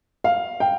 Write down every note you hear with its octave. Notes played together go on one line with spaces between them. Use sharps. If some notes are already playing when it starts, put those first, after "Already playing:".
F5
G5